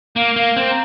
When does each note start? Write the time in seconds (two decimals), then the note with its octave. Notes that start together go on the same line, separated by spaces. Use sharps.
0.16 A#3 F5
0.36 A#3
0.42 F5
0.56 C4
0.70 A#5